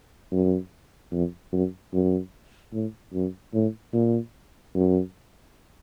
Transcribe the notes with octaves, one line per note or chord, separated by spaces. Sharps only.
F#2
F2
F#2
F#2
A2
F#2
A2
A#2
F#2